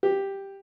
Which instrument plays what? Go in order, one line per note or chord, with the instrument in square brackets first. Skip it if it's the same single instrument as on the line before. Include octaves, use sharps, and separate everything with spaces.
[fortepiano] G4